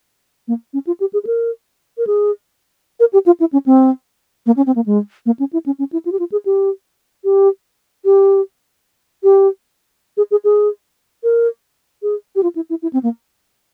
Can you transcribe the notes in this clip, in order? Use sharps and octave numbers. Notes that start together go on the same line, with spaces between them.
A#3
C#4
F4
G4
G#4
G#4
A#4
A#4
G#4
A#4
G4
F4
E4
C#4
C4
A#3
C#4
C4
A#3
G#3
A#3
C#4
E4
C#4
C#4
E4
F4
G4
F4
G#4
G4
G4
G4
G4
G#4
G#4
G#4
A#4
G#4
G4
F4
E4
E4
E4
C4
A#3